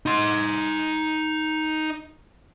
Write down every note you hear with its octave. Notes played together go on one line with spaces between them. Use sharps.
D#4 C6